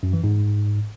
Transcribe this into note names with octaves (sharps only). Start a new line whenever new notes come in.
F#2
E3
G#2